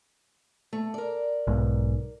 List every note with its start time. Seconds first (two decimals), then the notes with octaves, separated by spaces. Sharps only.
0.73 A3
0.94 A#4 D5
1.47 B1 G#2